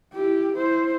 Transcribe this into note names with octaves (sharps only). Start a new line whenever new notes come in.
E4 G4
E4 C5